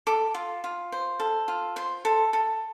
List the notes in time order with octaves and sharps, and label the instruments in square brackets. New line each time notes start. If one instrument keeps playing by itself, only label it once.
[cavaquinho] A4 D6
F4
F4
C5
A4
F4
C5 C6
A4
A4